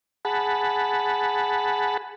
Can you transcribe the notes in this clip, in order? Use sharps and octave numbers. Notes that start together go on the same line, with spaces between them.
G#4 F#5 A5 B5